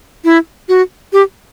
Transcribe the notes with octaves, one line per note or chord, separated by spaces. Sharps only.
E4
F#4
G4